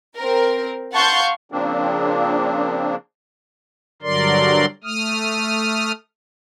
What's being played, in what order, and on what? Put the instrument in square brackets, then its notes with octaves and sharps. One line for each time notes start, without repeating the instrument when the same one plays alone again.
[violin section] C4 A#4
F5 F#5 A5 C6 C#6 G6
[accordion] C#3 F3 A#3 C4 D4
[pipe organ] G2 D3 F#3 A#4 D5 C6
A3 D#6 F6